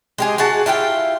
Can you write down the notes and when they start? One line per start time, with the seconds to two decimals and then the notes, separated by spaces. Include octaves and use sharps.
0.18 G#3 G4 G#4
0.38 F#4 G#4 F#5 A5
0.66 E4 F4 G4 G5